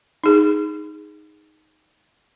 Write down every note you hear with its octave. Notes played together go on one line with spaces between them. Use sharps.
D#4 G#4